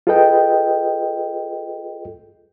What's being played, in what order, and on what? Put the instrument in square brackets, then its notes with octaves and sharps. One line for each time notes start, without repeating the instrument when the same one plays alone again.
[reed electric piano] F4 G#4 A4 B4 D#5 G5